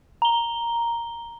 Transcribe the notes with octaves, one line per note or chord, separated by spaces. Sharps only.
A#5 G7